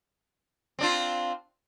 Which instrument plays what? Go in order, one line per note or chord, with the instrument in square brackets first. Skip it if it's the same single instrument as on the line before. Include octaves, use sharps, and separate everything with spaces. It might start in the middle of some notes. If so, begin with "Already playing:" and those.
[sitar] C4 D4 F4